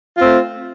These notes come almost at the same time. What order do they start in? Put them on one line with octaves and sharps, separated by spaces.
F4 C4 A3